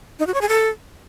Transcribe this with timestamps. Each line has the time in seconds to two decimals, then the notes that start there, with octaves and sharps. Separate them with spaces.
0.19 D#4
0.27 F#4
0.34 C#5
0.41 G#4
0.49 A4